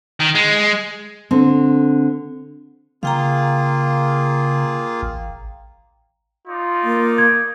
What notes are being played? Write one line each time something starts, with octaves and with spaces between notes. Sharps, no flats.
D#3
G#3
D3 C4
C#3 A#3 F4 G#4 F5 G5 A#5
A1
D#4 F4 D5
A#3
G#6